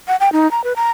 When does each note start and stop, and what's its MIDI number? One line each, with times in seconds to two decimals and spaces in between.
0.08 0.16 78
0.20 0.32 79
0.33 0.50 63
0.51 0.64 82
0.64 0.76 71
0.76 0.91 82